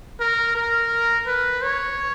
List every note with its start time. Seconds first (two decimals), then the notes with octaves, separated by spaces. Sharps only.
0.20 A#4
0.56 A#4
1.27 B4
1.62 C#5